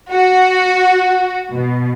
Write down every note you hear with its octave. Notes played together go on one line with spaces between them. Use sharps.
F#4
B2